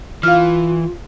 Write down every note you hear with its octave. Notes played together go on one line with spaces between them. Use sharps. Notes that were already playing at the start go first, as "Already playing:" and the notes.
E3 F4 F5 F6